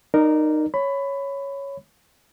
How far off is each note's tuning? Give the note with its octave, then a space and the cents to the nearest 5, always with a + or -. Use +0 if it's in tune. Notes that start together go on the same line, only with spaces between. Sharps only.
D#4 -20 A#4 +0 D5 +0
C#5 +0 B5 +15